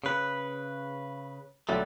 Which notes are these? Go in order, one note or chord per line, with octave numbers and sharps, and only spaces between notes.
C#3 B4
B1 D3 F#3 G3 A3